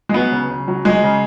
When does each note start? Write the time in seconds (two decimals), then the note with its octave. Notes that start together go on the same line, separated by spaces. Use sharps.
0.09 G#3
0.14 F#3 B3
0.32 C#3
0.50 C#3
0.68 F#3
0.85 F#3 G#3
1.03 C#3